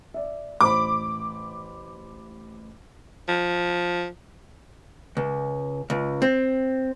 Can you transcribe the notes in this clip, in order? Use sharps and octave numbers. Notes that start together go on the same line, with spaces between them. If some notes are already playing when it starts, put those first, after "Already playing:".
D5 E5
A1 C5 B5 D6
F3
C#2
C#2
C4